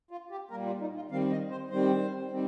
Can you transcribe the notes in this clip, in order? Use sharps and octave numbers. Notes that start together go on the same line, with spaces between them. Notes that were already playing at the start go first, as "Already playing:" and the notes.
F4
G4
A#2 G3 A#3 A#4
F4
D#4
F4
D#3 G3 C4 F5
D#5
C5
D#3 G3 C4 C5
D#3 G3 C4